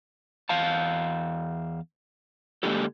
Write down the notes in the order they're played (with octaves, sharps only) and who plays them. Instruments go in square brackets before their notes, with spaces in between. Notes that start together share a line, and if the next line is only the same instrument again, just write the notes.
[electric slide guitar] E2 F5 A5
D3 G#3 A#3 D4 G4 A4